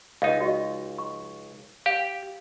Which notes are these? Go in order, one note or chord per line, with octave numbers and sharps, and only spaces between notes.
C#2 D#4 D#5 F5 D6
F#4 D#5 C#6
C#6
G4 F5